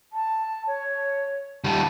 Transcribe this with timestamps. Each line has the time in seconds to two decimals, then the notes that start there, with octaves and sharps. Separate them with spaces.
0.13 A5
0.67 C#5
1.64 D#3 G3 A5